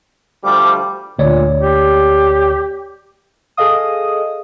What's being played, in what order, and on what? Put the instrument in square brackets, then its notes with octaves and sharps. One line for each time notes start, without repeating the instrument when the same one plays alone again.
[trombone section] D2 F3 G3 [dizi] D6
[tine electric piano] D2 C#5 D5 [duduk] A#2
[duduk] G4
[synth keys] G#4 A4 D#5 F5 D#6